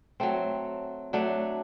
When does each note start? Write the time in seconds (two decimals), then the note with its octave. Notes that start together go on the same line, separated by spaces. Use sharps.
0.20 F#3 A3 C4
1.13 F#3 A3 D4